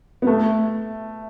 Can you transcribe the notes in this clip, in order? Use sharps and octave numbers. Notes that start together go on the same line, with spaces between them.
B3
A3